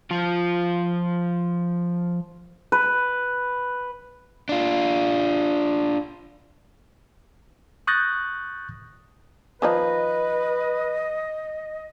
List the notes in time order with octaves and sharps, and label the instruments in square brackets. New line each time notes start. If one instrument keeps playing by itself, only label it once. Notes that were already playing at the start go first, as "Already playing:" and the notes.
[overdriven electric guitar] F3 F4
[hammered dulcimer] B4
[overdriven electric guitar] D4 F4
[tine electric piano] C#6 D#6 F#6 G6 A6 A#6
[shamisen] D#3 F3 D#4 [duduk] B4 [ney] D#5